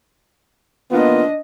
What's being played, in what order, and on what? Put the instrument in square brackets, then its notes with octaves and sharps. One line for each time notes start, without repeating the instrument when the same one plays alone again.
[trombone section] A#3 B3 F4 [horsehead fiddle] D4 D#5